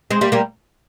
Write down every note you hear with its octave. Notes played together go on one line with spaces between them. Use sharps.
G#3 C4
G3 A#3
G3 A#3